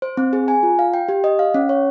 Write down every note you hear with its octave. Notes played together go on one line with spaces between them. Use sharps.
C5
C4
G#4
G#5
F4
F5
G5
G4
D#5
F5
C#4
C#5